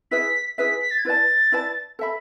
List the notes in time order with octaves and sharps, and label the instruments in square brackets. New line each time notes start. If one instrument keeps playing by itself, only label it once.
[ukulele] E4 G#4 B4 E5 [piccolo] B6
[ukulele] E4 G#4 B4 E5 [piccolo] B6
[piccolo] B6
A6
G#6
[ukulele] E4 B4 D5 A5 [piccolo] A6
[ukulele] E4 B4 D5 A5
A4 E5 B5